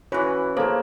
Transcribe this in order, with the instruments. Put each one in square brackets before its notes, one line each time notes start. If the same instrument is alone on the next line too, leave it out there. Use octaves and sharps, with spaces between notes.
[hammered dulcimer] E3 B4 [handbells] C#4 E4 F#4 [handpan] C#5
[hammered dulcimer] A#3 [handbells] G#4 C#5 A5 [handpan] A4 C5